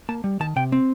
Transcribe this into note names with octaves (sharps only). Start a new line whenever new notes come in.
A#3 A5
G3
D#3 A5
C3 G5
C4